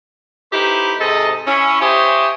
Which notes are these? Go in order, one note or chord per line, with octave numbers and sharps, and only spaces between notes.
A3 D#4 E4 G4 B4 C5
G#2 C3 G#3 A4 D#5
C#4 E4
G4 C5 C#5 D#5 E5 G#5